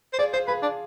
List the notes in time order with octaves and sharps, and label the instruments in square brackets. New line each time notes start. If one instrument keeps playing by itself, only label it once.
[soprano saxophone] C5
[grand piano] F4 G#4 [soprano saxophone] D5
[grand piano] F4 G#4 [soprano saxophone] C5
[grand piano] F4 G#4 [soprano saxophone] B4
[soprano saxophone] D4